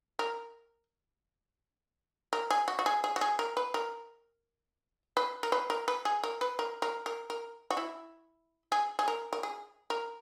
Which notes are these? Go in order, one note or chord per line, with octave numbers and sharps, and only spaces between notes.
A#4
A#4
G#4
F#4
F#4
G#4
G#4
F#4
G#4
A#4
B4
A#4
B4
A#4
B4
A#4
B4
G#4
A#4
B4
A#4
A#4
A#4
A#4
F#4
E4
G#4
G#4
A#4
A#4
G#4
A#4